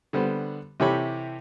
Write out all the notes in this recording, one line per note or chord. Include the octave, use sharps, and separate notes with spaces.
D3 G3 B3 C5
C3 E3 G4 A4 C#5 B5